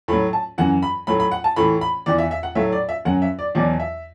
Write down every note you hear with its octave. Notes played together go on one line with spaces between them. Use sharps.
A2 F#3 B5
A5
F#2 E3 F#5
B5
A2 F#3 B5
B5
F#5
A5
A2 E3 B5
B5
E2 E3 D5
E5
E5
F#5
A2 F#3 E5
D5
E5
F#2 F#3 F#5
E5
D5
E2 B2 F#3 D5
E5